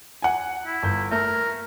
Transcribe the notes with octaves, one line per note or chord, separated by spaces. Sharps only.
F#5 G#5
E4
G1 G6
A3 A#4